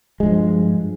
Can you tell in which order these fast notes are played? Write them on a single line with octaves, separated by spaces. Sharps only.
G#3 G2 F3